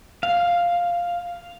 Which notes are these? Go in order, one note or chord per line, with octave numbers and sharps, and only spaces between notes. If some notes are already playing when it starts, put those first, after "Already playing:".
F5